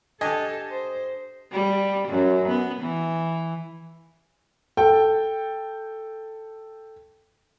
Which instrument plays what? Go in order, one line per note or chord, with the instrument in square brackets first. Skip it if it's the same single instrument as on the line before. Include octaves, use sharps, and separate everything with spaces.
[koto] D4 G4 [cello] A4 [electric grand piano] D#5 [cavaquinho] G#5
[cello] C5
[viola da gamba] G3
F#2
B3
E3
[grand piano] A4 G5